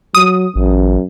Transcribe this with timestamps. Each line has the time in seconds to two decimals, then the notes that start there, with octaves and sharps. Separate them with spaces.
0.15 F#3 D#6
0.56 A1 F#2